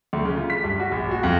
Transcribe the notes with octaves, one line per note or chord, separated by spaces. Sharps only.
D2
C#3
F4
B6
G2
F#4
A#1
F#4
F2